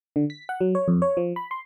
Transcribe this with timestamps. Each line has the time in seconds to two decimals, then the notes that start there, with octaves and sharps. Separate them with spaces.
0.16 D3
0.30 B6
0.49 F#5
0.61 F#3
0.75 C#5
0.88 F2
1.02 C#5
1.17 F3
1.36 B5
1.51 C6